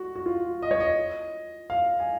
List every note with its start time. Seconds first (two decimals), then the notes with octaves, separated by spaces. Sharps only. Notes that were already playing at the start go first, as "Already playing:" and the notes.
Already playing: F#4
0.16 F#4
0.26 F4
0.62 D#5
0.71 C#5
0.80 D#5
1.70 F5
2.00 G#5